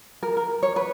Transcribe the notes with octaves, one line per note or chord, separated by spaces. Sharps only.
A#4
A#4
C#5
B4